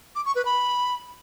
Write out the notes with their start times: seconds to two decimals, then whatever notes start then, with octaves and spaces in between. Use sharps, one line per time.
0.16 D6
0.25 C#6
0.35 B4
0.45 B5